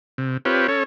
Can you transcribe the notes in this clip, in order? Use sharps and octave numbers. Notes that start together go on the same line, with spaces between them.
C3
C4 F4 G4 B4 C#5
C#4 A4 C#5